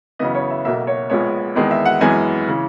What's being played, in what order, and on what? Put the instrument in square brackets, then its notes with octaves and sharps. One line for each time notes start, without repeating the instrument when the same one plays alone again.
[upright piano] F#2 C#3 E3 B3 D#5
C#5
E5
B1 B2 A#3 E5
C#5
A#1 A#2 G#3 B3 C#5
E2 D#3 G#3 B3
E5
F#5
F#2 E3 G#3 B3 G#5
C#3 E3